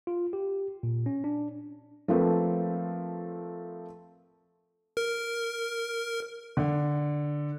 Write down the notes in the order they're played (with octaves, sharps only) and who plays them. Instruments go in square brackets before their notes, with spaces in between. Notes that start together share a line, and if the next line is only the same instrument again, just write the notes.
[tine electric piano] F4
G4
A#2
C#4
D4
[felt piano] F3 A3 A#3 C4 B4
[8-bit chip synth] A#4
[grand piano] D3